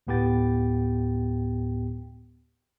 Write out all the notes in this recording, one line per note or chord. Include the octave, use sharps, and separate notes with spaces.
D2 A2 B3 G4 G5 A6